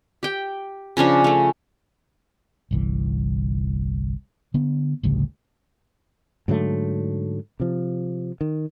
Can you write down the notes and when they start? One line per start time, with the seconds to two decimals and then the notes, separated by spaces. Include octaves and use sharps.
0.23 G4 G5
0.97 C#3 F3 C#4 D4
1.24 A3 C#4
2.71 G1 C2 E3
4.54 D3 B3 D4
5.03 A1 D2 G2 C#3
6.48 G#2 D3 F#3 A3
7.60 C3 F3
8.41 D#3